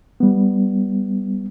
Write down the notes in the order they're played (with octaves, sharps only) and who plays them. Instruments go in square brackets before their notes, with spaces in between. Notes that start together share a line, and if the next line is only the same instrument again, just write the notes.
[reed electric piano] G3 B3